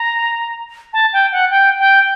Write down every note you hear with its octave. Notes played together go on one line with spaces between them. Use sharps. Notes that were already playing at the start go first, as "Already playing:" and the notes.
Already playing: A#5
A5
G5
F#5
G5
G5